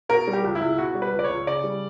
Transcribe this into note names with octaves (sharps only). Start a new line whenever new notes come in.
B2 A#4
G3
G4
C#2
E4
C#2
B2 F#4
G3
B4
C#2
D5
C#5
C#2
C#3 D5
G3